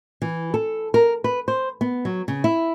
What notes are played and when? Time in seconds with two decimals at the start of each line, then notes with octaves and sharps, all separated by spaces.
0.22 E3
0.54 A4
0.94 A#4
1.24 B4
1.48 C5
1.81 B3
2.05 F#3
2.28 C#3
2.44 E4